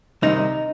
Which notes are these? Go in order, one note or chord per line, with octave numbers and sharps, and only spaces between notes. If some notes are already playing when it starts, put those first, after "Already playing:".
C2 C3 D#3 D#4